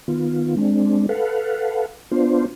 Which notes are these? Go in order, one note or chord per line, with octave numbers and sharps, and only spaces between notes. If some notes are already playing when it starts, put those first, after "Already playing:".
D#3 B3 F4
G#3 C4 D4
A4 B4 F5 F#5
B3 D4 F4 C5